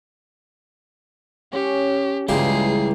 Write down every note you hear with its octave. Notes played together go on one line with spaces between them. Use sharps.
C#4 G4 C#6
C#2 G2 E3 G#3 A#3 G4 G#4 C7